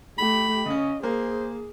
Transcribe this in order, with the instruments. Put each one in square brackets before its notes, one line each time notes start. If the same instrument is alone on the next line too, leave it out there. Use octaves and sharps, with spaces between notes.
[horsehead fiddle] A3 G4 [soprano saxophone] B5
[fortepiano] C#3 C#4 [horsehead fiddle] D#5
[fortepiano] A#3 [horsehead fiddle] G#4 [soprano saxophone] C5